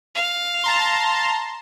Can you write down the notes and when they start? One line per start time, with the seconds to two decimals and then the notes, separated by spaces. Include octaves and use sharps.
0.15 F5
0.64 A5 A#5 C6